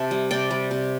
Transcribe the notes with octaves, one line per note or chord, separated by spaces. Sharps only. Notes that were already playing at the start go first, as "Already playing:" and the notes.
Already playing: C3 E5 A5
G3
C3 D5 G5
G3
C3